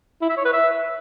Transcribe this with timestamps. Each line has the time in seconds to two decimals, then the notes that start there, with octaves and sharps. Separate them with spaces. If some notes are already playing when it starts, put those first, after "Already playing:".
0.21 E4
0.29 E5
0.37 C#5
0.45 B4
0.53 E5